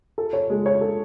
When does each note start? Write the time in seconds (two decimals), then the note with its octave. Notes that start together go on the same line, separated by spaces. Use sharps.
0.18 A4
0.33 C#5
0.50 G#3
0.66 C#5
0.81 A4